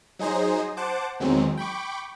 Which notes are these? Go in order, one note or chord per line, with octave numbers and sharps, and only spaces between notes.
F#3 D#4 G#4 C5 D#5
C5 F#5 A5 D6
E2 D#3 F#3 G#3 C4
G5 B5 C#6 D6